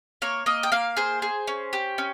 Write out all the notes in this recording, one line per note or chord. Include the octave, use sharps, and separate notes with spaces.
A#3 C#5
A#3 D#5
G5
A#3 F5
G#4 C5
G#4
C#4
G4
C#4